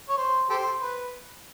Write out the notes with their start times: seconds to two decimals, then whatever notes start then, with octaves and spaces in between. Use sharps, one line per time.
0.09 C#5
0.17 C5
0.49 G4 A4 C5
0.82 B4